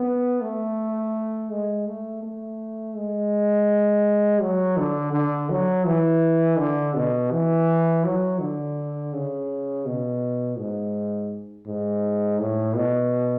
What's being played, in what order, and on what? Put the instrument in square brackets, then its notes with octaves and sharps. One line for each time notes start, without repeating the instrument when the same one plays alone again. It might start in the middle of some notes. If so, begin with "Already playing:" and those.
Already playing: [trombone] B3
A3
G#3
A3
A3
G#3
F#3
D3
D3
F#3
E3
D3
B2
E3
F#3
D3
C#3
B2
G#2
G#2
A2
B2